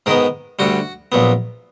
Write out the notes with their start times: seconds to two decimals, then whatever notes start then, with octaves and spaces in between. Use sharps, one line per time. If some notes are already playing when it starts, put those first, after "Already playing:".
0.06 G#2 D#3 G#3 B3 A#4
0.59 D2 D3 G3 F#4
1.12 A#1 A#2 F#3 B3